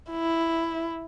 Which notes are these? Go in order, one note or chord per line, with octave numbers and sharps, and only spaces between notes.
E4